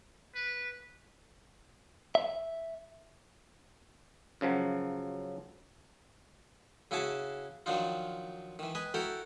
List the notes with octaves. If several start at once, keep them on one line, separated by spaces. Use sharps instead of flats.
B4
E5
F#2 C#3 F3 F#3
C#3 E4 F#4 G#4 G#5 A5
D#3 F3 F#3 D4 D#4 F4
D#3 E3
B4 D#5 G#5
E4 F#4 A4 A#4 G5 A#5